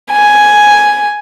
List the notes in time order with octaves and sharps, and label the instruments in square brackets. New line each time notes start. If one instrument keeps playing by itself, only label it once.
[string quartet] G#5